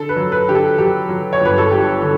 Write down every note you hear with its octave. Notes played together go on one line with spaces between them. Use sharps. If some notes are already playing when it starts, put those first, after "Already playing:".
Already playing: D3 A4
B4
F#3
B4
D3 G4
A4
F#3 G4
F#3
C#5
G1
B4
A4
G2 G4
D3